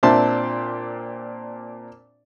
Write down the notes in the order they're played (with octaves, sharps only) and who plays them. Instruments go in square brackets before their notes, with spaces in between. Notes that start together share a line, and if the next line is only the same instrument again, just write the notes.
[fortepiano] A#2 C4 D4 E5 A5 C6